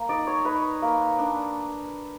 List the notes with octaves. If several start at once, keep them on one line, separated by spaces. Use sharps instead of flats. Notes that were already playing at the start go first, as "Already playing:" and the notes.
Already playing: A#3
D#4 D5
C#5
D#4 B4
A#3
D4